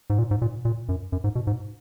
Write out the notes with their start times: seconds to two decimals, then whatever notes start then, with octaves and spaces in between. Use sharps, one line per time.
0.10 G#2
0.18 A#2
0.31 G#2
0.42 A#2
0.65 A#2
0.89 F#2
1.12 F#2
1.24 G#2
1.35 B2
1.47 G#2